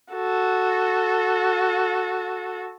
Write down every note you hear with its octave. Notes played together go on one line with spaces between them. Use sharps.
F#4 A4